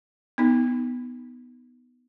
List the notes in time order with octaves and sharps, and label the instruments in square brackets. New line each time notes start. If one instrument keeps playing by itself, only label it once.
[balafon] B3 D#4